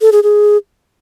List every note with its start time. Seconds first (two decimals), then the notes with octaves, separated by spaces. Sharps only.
0.01 A4
0.12 G#4
0.23 G#4